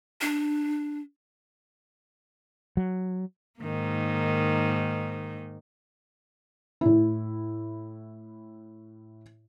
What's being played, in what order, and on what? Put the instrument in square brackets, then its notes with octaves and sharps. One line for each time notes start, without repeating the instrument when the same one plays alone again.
[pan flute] D4
[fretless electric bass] F#3
[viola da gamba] G#2 D#3 A#3
[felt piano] A2 E4